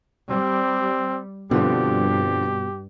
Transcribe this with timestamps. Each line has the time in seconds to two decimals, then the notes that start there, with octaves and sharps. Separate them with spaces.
0.31 G3 C4
1.51 G2 B2 D3 F3 C4 G4